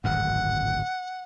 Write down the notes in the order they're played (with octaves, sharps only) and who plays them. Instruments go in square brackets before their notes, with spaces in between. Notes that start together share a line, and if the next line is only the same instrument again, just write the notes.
[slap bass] D1 G#1 F#2 [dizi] F#5